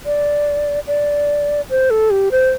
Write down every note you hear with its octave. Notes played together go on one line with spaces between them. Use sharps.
D5
D5
C5
A4
G4
C5